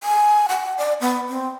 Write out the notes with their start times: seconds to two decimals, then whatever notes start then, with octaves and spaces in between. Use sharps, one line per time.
0.04 G#5
0.49 F#5
0.78 D5
1.01 B3
1.29 C4